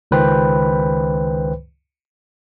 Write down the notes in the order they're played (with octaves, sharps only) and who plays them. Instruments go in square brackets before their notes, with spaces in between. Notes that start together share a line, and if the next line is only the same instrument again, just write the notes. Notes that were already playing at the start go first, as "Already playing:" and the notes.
[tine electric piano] C#2 D#3 B4 C5 G5 B5